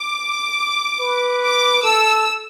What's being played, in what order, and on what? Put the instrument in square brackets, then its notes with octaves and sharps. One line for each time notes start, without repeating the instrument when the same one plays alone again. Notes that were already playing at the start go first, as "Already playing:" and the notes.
Already playing: [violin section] D6
[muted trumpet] B4
[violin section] D6
[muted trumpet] A4 [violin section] E6